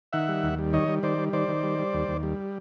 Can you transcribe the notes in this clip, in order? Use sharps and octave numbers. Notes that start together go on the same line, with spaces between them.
D#3 E5 F#5
G3
D#2
G3
D#3 C#5 D#5
G3
D#3 C5 D5
G3
D#3 C5 D5
D#3
G3
G3
D#2
D#2
G3